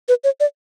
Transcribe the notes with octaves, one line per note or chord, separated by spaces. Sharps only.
B4
C#5
D5